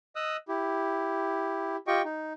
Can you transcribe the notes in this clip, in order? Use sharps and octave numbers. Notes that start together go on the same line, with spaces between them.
D#5 D#6 E6 F#6
E4 G4
F4 G4 D#5 G5 C#6
D#4